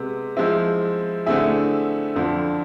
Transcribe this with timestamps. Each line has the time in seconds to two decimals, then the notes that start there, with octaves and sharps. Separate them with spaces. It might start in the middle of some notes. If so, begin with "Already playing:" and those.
Already playing: C3 G#3 B3
0.37 F3 G#3 C4 E4
1.26 D3 A3 C4 E4 G#4
2.16 F2 D3 F3